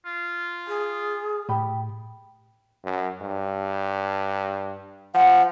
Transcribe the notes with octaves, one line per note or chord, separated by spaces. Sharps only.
F4
G#4
A2 G4 B5
F#2
G2
F3 F#5